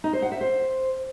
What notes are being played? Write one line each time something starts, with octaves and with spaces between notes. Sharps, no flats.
D#4
C5
F#5
E5
C5